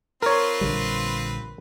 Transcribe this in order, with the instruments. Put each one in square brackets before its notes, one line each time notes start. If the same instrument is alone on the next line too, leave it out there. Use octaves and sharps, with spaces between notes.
[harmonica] C4 F4 B4 [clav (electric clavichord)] A#4 C#5
[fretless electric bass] A#1 D3 G3